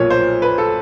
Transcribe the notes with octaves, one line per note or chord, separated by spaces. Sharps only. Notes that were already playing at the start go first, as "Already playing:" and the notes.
Already playing: B1 A#2 F3 A#3 C#5
C5
B4
A4